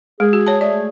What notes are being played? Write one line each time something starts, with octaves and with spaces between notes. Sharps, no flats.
G#3 G#4
F#4
C#5 A5
A3 G#4 D5